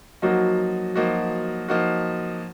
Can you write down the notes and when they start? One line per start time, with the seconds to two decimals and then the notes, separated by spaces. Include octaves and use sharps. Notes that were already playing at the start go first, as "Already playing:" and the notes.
0.22 F3 F#3 A#3 D#4 F#4
0.95 F3 A#3 D#4 F#4
1.68 F3 A#3 D#4 F#4